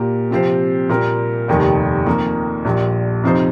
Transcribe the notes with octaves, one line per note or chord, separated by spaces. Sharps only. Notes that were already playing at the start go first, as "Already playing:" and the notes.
Already playing: A#2 A#3 G4
C3 F3 C4 G4 C5
A#2 G3 A#3 G4 A#4
F1 D#2 D#3 G3
F2 D#3 A#3
A#1 A#2 G3
F2 C3 F3 D#4 C5